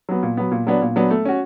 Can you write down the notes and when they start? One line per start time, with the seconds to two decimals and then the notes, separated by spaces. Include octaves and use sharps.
0.09 F#3 B3
0.23 A#2
0.37 F#3 B3
0.52 A#2
0.67 F#3 B3 D4
0.82 A#2
0.96 F#3 B3 D4
1.11 A3
1.25 C#4 F#4